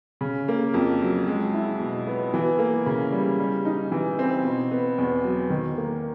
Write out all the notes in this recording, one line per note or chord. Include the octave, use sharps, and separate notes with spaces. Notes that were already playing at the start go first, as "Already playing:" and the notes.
C#3
A#3
F2
F#3
G#3
E4
B2
B3
E3
A#3
C#3
G3
G3
D#4
E3
C4
B2
B3
E2
F#3
D#3
A#3